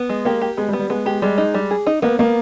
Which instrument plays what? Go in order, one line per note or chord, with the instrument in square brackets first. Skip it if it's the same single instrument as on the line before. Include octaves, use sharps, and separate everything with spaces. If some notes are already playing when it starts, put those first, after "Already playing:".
Already playing: [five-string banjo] B3
G#3
[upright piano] A#3 [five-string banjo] G4
[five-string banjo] G4
[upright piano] G#3 [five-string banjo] B3
[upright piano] G3
[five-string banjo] B3
[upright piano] G3
[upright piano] G#3 [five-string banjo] B3
[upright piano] G#3 [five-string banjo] G4
[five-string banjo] G3 [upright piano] G#3
[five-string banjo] D#4
G3
G#4
D#4
[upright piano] A#3 [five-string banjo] B3
[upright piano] A#3 [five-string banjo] B3